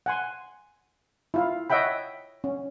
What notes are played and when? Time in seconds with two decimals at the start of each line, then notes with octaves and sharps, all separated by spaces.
0.06 F#5 G#5 C6
1.34 E4 F4 F5
1.70 C#5 D#5 E5 F#5 G5 B5
2.44 C#4